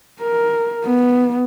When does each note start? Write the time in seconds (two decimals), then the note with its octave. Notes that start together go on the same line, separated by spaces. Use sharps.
0.21 A#4
0.85 B3